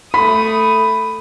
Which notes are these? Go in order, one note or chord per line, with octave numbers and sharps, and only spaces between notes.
A3 B5 D#6